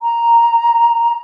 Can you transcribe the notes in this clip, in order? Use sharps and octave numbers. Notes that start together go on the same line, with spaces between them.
A#5